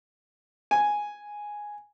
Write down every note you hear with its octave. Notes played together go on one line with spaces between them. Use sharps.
G#5